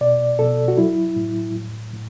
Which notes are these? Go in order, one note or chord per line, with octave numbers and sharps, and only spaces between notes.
B2 D5
B2 A4
F#4
F#3 E4
A2
A2
A2